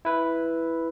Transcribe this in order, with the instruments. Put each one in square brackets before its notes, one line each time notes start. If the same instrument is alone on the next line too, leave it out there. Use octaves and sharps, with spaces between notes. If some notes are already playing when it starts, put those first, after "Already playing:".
[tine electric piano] E4 B4